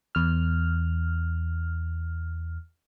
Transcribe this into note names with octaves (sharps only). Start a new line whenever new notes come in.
E2 F6